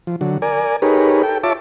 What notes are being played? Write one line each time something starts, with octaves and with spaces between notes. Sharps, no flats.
F3
D3 F#3
A#4 D5 G#5
D#4 G4 G#4 A#4 B4 C#5
A4 G5
F4 C#5 E5 A5 D6